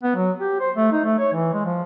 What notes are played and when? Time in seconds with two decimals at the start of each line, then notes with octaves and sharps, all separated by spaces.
0.03 B3
0.16 F#3
0.40 G4
0.60 C5
0.76 A3
0.92 D#4
1.04 A3
1.18 C#5
1.33 E3
1.53 G#3
1.65 F3